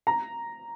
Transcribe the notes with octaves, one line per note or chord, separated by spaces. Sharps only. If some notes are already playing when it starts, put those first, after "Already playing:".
A#5